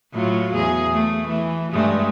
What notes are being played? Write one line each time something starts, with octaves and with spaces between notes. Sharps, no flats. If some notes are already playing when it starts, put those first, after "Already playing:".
A2 F#3 F4
E2 G#4
A3
E3
G2 G#3 A3